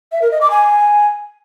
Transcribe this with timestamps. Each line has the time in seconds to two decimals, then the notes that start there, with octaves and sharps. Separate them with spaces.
0.12 E5
0.22 A#4
0.31 D#5
0.41 D6
0.51 G#5